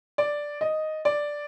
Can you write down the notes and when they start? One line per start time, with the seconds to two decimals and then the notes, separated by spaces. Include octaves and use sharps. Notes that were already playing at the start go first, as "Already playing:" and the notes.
0.18 D5
0.61 D#5
1.05 D5